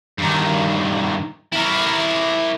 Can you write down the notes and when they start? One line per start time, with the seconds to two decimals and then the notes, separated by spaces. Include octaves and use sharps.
0.18 G2 D#3
1.53 E4 A#4